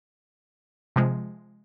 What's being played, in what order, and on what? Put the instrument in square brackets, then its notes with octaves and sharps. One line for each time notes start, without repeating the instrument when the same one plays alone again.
[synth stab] C3 F3 G#3